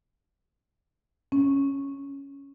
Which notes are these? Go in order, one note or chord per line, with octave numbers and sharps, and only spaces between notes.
C#4